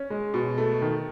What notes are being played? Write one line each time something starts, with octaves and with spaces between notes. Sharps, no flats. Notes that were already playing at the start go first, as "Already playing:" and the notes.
Already playing: C#4
G#3
B2
A3
D#3